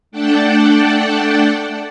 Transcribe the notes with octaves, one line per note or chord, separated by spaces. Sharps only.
A3 D4 D5 F#5 G5 A5